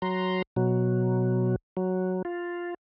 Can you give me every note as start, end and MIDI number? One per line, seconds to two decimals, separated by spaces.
0.02 0.42 54
0.02 0.42 82
0.02 0.42 84
0.56 1.56 47
0.56 1.56 54
1.77 2.22 54
2.25 2.74 65